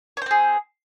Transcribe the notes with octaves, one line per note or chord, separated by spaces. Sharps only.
C4 G#4 C5 C#5